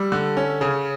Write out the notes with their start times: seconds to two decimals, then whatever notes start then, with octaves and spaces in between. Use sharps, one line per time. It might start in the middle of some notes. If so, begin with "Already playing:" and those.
Already playing: G3 E6
0.12 D3
0.37 C#4
0.61 C#3